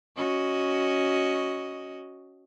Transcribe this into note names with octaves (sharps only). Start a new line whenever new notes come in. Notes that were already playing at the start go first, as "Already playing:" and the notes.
C#4 F#4 D#5